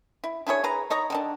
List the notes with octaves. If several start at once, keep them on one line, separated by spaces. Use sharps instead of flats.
E4
D4 E4 G#4 C#5
G#4 B4 A#5
D#4 C#5 D#5 A#5
D3 D#3 D4